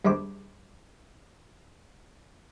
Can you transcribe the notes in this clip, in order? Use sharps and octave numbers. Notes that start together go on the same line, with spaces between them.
G2 G#3 C5 D6